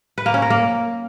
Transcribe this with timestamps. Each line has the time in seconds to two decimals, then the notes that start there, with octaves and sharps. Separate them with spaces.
0.18 B4
0.26 A#3
0.34 C#4
0.42 A#4
0.50 A#3